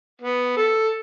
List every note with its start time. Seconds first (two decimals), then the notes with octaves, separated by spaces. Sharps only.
0.22 B3
0.57 A4